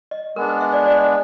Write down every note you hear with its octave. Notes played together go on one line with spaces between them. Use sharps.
D#5
G#3 B3 D4 A#4
B4
E5
D5
D5
D#5